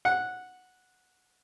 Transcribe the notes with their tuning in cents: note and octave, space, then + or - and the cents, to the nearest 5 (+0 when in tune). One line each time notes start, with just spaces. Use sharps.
F#5 -10